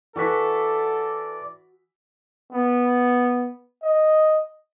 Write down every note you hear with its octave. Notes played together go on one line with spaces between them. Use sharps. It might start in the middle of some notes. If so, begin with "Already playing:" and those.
E3 F#4 A4 D5 B6
B3
D#5